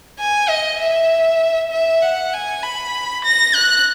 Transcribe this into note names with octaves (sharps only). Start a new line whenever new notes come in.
G#5
D#5
E5
E5
F#5
G#5
B5
A#6
F#6